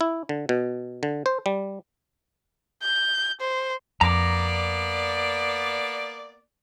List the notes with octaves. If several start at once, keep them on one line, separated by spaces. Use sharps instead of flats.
E4
D3
B2
D3
C5
G3
G6
C5
F2 A#3 B3 D5 A#5 D6